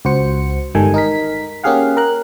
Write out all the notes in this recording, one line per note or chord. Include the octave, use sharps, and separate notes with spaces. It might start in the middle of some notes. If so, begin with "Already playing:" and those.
C#2 F#4 C5 C#7
G1 G#2 D#3 G3 A4 G#5
D#4 A#4 B6
A#3 C#4 G4 G#4 F5 F#5
A#4 F#6